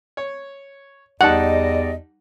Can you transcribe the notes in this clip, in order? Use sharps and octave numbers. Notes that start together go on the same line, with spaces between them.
C#5
E2 G3 D#4 D5 D#5 F#5 A5